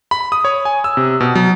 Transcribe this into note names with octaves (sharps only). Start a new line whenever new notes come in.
B5
D#6
C#5
G#5
E6
C3
B2
F#3